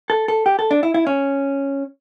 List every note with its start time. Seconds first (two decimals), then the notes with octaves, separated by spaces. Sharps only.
0.10 A4
0.28 A4
0.46 G4
0.59 A4
0.71 D4
0.83 E4
0.94 E4
1.07 C#4